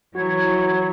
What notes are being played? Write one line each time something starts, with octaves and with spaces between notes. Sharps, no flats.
E3 F#3 E4 F#4 C#5 G#6